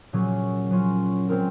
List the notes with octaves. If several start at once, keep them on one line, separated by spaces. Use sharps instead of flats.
A#2 F#3 C#4 G#4
F#3 C#4 F4
G#3 C4 F4 A#4